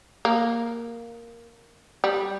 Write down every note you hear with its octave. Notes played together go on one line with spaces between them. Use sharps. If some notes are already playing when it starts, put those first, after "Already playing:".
A#3
G3